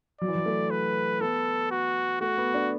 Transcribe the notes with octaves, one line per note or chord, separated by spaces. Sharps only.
F#3 D5
E3
F#3
A3
B4
B3 A4
F#4
A3 F#4
B3
D4